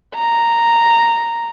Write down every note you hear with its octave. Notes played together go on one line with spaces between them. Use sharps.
A#5